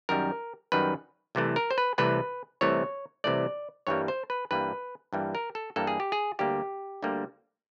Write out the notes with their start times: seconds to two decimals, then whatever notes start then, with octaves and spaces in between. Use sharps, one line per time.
0.09 F#2 D#3 G3 A#4
0.72 F#2 D#3 G3 B4
1.35 C2 C3 E3 A3
1.56 A#4
1.71 C5
1.78 B4
1.98 C2 C3 E3 A3 B4
2.61 C2 C3 E3 A3 C#5
3.24 C2 C3 E3 A3 D5
3.87 G2 E3 G3 A#3 C#5
4.08 C5
4.30 B4
4.51 G2 E3 G3 A#3 B4
5.13 G2 E3 G3 A#3
5.35 A#4
5.55 A4
5.76 G2 E3 G3 A#3 A4
5.87 G#4
6.00 G4
6.12 G#4
6.39 D2 D3 G3 A#3 G4
7.03 D2 D3 G3 A#3